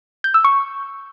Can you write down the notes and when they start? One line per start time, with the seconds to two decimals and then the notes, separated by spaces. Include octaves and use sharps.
0.24 G6
0.34 E6
0.45 C#6